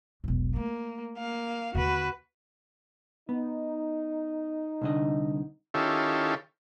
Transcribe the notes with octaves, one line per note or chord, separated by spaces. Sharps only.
E1 B1
A3 A#3
A#3 F5
D#2 D3 F#4 B4
B3 D#4
C2 D3 D#5
D#3 C#4 E4 F4 G4 A4